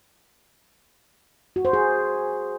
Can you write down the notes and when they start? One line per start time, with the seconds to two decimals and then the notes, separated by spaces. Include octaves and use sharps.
1.56 F#4
1.65 C5
1.73 G#4